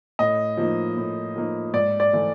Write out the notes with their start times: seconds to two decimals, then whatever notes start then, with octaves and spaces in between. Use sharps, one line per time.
0.19 A2 D#5
0.57 F3 A#3 D#4
0.97 A2
1.36 F3 A#3 D#4
1.73 G#2 D5
2.00 D5
2.13 E3 A3